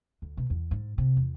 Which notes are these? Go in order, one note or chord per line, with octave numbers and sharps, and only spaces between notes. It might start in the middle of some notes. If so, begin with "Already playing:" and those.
D2
B2
E2
G#2
C3
E2